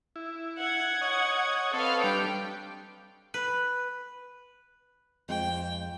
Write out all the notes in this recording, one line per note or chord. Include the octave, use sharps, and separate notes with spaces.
E4
F#5 G#6
C#5 D#5
C4 A4 B4 C#5 D#5 F5
G3 D4 G5
B4
F2 G#3 G5